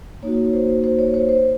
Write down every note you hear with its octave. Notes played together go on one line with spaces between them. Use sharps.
A#3 D#4 F#4 C#5
C5
C5
C#5
C5
C5